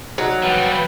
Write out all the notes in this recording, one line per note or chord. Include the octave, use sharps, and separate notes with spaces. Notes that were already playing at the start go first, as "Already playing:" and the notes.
F#3 D#4
F3 G3 B3
B4